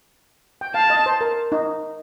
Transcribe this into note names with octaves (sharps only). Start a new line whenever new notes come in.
G5
F5 A5
D#5
C5
A#4
D#4